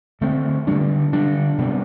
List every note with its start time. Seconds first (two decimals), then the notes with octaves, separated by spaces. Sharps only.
0.21 D3 A3 C4
0.67 D3 G3 D4
1.12 D3 G3 D4
1.58 C3 G3 B3